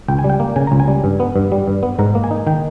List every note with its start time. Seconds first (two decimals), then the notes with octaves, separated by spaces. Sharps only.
0.08 C#2 G5
0.19 G#5
0.24 G3
0.30 G5
0.40 A#3
0.56 C#3 G#5
0.67 C#2 A#5
0.80 G#5
0.88 G3
1.04 G2
1.20 B3
1.36 G2
1.52 G3
1.68 G2
1.83 B3
1.99 G#2 A#5
2.15 A#3
2.24 G#5
2.31 D#4
2.47 D#3 G5